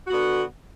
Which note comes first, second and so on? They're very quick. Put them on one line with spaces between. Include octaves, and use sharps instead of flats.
F#4 B3 D3